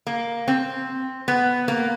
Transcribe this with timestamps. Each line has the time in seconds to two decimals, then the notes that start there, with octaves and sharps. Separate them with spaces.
0.07 A#3
0.48 C4
1.28 B3
1.68 A#3